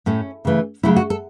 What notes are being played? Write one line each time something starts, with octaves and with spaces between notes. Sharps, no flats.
A2 A3 C#4
C#3 E3 A3
C#3 F#3 A3 E4
F#4
A4